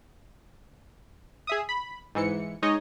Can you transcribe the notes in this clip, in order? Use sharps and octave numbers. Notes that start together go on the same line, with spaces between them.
G#4 E5 D#6
B5
G#2 E3 C#7
G#3 D#4 C#5 D#5